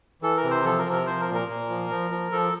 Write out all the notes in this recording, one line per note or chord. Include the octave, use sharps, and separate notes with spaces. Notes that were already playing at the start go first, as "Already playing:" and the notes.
E3 A4
A#4
C3
C5
F3 A4
A#4
C3
A#4
F3 C5
A#4
A#2
A#4
A#2
F3
F3
F3
F3 A4